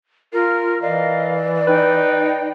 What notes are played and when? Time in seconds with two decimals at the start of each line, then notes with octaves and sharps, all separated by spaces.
0.34 F4 A#4 F6
0.82 E3 A#4 D5 D#5 F5
1.68 D#4 B4 G5